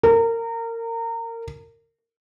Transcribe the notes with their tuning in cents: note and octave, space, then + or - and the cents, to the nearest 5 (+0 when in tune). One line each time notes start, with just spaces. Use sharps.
A#4 -25